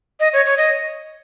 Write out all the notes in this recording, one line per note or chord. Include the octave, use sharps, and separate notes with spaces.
D#5
C#5
C#5
D#5